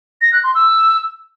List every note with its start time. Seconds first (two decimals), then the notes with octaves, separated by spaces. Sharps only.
0.22 A#6
0.33 F#6
0.44 C6
0.55 E6